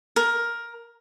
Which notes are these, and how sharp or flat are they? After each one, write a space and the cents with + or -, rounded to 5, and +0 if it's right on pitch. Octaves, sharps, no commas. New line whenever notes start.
A#4 +10